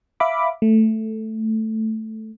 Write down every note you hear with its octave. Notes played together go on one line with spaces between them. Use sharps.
E5 F5 B5 D6
A3